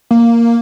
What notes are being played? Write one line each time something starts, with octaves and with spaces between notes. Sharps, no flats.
A#3